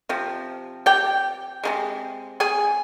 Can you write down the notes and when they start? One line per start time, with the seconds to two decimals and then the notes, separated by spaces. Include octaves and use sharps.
0.09 C3 F3
0.86 G4 G5
1.63 C3 F3 G#3
2.40 G#4 G#5